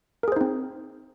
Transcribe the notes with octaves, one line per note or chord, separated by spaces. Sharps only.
C4 D#4 G#4 A#4 C5